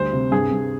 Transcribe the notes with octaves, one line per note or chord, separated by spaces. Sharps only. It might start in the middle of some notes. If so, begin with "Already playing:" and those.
Already playing: D2 G3 C5
C3
G2 G#4
G2